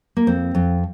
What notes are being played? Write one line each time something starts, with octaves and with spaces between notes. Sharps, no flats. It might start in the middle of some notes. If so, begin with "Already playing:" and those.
A#3
F2 C4
F2